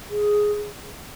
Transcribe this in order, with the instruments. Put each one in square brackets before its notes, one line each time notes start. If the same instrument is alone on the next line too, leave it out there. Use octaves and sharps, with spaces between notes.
[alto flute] G#4